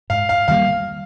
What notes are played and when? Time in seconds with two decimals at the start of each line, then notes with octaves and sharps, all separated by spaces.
0.10 G#2 F5
0.29 F5
0.48 D#3 G3 A#3 F5